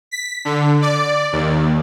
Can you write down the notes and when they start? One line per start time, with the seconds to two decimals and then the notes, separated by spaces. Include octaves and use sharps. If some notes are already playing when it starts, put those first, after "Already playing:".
0.11 B6
0.45 D3
0.82 D5
1.32 D#2